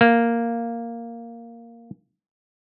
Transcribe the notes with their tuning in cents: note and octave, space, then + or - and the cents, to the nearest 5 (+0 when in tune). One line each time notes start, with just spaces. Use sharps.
A#3 -5